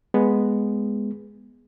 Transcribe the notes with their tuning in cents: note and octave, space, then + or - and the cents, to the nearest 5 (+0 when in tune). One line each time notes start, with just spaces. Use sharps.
G#3 +0 B3 +0